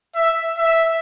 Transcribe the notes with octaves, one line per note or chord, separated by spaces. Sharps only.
E5
E5